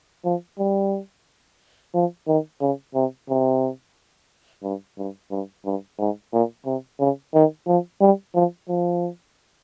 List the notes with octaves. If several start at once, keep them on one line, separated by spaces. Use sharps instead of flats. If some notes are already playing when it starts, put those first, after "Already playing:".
F3
G3
F3
D#3
C#3
C3
C3
G2
G2
G2
G2
G#2
A#2
C3
C#3
D#3
F3
G3
F3
F3